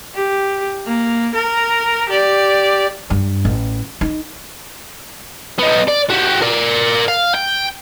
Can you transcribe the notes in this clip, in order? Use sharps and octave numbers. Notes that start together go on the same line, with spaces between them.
G4
A#3
A#4
G4 D5
G2
A1
D#4
B3 D#4
D5
F#4 G4
A#4 D5
F5
G5